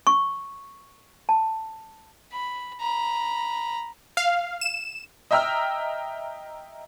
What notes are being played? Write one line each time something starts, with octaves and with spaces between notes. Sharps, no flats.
C#6
A5
B5
A#5 B5
F5
E7
D#5 E5 G5 A#5 E6 F6